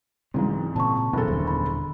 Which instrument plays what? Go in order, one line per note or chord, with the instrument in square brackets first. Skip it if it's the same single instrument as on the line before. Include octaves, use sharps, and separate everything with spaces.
[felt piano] C2 G#2 [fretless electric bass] C#3 E3 F#3
[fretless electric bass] A#2 C#3 C4 [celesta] A5 C#6
[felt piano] F#1 E2 A4 [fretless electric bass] B2
[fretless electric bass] D#1 D3
[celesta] B5